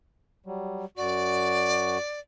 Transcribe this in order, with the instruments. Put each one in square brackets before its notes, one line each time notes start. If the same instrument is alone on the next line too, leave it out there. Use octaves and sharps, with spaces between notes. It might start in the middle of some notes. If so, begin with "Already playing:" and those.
[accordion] F#3 G3
[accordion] F#2 F#4 [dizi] D5